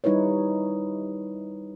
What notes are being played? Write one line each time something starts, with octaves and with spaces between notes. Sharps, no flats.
G3 D#4 E4 B4 C#5